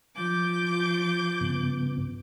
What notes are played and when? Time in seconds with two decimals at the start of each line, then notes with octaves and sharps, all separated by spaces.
0.14 F3 D6 G6
1.41 G2 C#3 B3